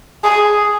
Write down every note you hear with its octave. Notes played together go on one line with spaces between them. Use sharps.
G#4